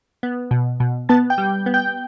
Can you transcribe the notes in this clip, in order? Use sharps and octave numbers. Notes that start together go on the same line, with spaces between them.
B3
B2
B2
B3 A5 A6
G5 G6
G3
B3
G5 G6